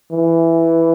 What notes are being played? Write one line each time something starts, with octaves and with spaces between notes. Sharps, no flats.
E3